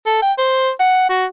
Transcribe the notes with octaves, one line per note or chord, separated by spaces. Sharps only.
A4
G5
C5
F#5
F#4